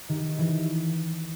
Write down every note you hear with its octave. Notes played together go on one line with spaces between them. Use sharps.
D#3
E3